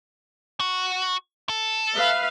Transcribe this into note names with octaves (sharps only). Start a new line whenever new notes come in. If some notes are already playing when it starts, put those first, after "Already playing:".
F#4
A4
B4 E5 F5